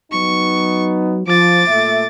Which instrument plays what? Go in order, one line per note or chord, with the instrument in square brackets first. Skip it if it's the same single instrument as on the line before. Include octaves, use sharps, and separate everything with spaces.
[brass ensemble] F#3 B3 D#4 [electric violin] C#6
[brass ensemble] F3 [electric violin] D6 A6
[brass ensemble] A#2 A3 E5